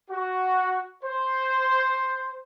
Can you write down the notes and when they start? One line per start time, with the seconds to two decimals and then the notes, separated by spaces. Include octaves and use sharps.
0.10 F#4
1.04 C5